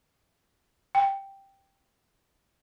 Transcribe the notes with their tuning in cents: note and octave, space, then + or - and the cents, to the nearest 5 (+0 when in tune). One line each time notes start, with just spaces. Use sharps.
G5 +0